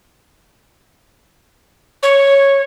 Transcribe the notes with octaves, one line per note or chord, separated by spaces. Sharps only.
C#5